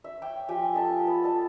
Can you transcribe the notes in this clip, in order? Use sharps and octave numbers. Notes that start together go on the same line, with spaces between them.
E5
C#5 E5 G5 D6
F3 G4 G5 G#5
F4 A4 D#5 A5
B3
A4 D#5 A5